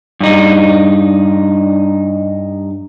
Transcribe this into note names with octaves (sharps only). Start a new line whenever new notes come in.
G2 D#4